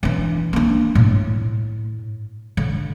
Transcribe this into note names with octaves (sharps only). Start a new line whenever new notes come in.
E3 D4
A#3 D4
A2
D3